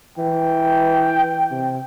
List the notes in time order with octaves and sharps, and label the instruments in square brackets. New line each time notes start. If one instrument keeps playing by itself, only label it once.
[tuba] E3 [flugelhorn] G5
[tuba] C3